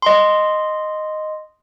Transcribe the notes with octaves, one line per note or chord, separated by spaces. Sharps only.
D#5 C6